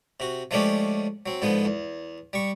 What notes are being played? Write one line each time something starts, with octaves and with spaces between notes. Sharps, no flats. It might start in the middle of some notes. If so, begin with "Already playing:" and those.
C3 F#4
F3 G#3 A3 C#4 D4 G4
F#3 C4
G#2 D3 F3 B3
E2
G3 C#6